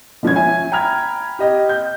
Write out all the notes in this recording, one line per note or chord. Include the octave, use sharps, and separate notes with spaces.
E1 F3 C#4 G#6
E5 G#5
G5 A#5 B5 F6 G#6
G4 D#5 G5
G6